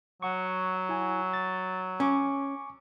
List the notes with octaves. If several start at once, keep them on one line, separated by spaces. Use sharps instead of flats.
F#3 F#5 C#6
E4 G#5
A6
C#4 G#5 C#6 D6